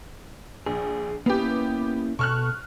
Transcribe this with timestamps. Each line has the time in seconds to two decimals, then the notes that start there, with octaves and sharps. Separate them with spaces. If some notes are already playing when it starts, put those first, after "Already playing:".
0.66 A#1 G#4
1.26 A#3 B3 C#4 E4 G4
2.19 B2 A4 C#6 F6 F#6